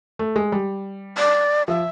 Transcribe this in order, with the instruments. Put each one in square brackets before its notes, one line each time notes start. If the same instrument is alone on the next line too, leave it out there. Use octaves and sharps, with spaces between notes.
[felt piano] A3
G#3
G3
[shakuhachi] D5
[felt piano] F3 [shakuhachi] E5